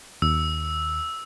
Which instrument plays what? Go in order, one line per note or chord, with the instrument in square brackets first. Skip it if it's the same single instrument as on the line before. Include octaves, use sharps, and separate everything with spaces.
[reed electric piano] D#2 [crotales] E6